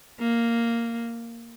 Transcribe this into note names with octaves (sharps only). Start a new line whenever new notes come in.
A#3